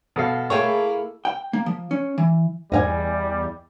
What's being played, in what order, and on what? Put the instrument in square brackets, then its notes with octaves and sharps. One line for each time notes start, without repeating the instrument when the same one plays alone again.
[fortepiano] B2 A4 F5
[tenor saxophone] A#3 [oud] E4 G#4 A4 [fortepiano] C#5 G5
[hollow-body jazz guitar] G5
A#3
F3
C#4
E3
[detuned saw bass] E2 [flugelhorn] G3 [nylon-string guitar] D#5 F5 G#5